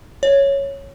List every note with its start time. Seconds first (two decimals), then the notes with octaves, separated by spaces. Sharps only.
0.23 C#5